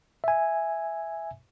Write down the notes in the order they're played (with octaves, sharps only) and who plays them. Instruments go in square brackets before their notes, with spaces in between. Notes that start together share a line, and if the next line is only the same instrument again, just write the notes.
[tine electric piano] E5 G#5